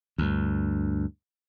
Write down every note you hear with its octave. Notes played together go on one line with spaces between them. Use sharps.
D2 G2